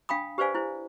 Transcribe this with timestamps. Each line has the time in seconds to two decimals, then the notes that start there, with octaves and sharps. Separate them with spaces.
0.09 D4 F5 G5 B5 D#6
0.38 G4 B4 C5 D5 F5 G#5
0.55 E4 C5